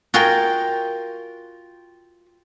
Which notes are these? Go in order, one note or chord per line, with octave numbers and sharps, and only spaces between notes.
F4 F#4 G#4 A#4 G5